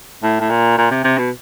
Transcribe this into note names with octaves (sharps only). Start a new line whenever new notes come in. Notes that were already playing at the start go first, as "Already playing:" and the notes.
A2
A2
A#2
A#2
C3
C3
B2